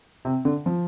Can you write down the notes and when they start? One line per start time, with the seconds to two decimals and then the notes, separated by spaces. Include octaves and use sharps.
0.25 C3
0.45 D3
0.66 F3